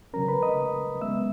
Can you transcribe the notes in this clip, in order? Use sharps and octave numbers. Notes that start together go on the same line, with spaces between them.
C#3 F#3 C#4 A#4 A#5
B4 B5
D#5 D#6
C#3 G#3 B3 E5 E6